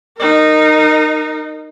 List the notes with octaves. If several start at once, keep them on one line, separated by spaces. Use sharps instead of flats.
D#4 A#4